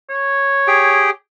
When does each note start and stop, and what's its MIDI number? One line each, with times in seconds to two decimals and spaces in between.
0.10 1.08 73
0.67 1.10 67
0.67 1.10 68
0.67 1.10 79